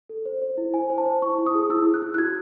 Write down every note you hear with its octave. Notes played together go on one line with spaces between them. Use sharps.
A4
C5
C5
E4
C5 G#5
C5
A5
C5
E4 C#6
E4
D#6
G#4
E4 E6
G#4
F#6
E4
F#6
F#4 G#6